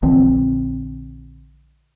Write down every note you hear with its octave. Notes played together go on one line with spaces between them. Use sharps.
A#1 D3 E3 C4